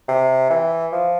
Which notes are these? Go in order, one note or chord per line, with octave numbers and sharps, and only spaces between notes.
C3
E3
F3